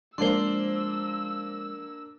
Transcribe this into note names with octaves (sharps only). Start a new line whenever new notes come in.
F3 G#3 A#3 D4 C5 C6 E6